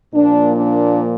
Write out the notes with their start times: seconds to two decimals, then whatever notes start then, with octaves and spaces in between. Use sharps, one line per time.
0.14 A#2 F3 A#3 D4
0.56 D4